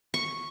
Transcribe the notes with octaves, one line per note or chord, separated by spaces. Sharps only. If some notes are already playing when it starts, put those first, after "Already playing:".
C#6